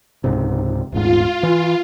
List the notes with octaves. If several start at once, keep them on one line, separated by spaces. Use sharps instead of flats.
C#2 G#2 C3
D#1 G#2 F4
E3